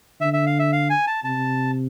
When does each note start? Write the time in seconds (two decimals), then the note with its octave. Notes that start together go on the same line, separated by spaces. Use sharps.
0.20 D3 E5
0.33 E5
0.46 F5
0.59 E5
0.72 F5
0.90 G#5
1.07 A5
1.24 C3 A5